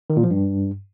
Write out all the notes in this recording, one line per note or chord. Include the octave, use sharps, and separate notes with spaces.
D#3
A#2
F3
G2